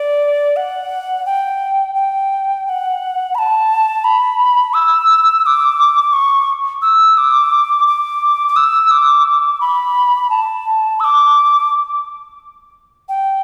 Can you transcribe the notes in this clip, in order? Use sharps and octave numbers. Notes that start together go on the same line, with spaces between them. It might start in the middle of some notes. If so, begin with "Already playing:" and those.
Already playing: D5
F#5
G5
G5
G5
F#5
B5
A5
B5
E6
E6
D6
C#6
E6
D6
D6
D6
E6
D6
B5
A5
E6
D6
G5